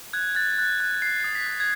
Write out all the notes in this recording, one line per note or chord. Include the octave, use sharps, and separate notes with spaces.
F#6 G#6
F#6 A6
F#6
F#6
F#6 C7
D#6
B6
F#6
G#6